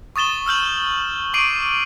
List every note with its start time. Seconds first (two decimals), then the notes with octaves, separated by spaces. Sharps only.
0.16 C#6 D#6 A6 E7 G7
0.46 E6 F6 G6 F#7
1.34 C#6 D6 C7 D7 D#7 F#7